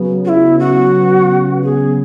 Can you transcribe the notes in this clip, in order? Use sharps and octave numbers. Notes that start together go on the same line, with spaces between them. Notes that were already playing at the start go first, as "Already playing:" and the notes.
Already playing: C#3 F#3 B3
F#4
E4
F#4
G#4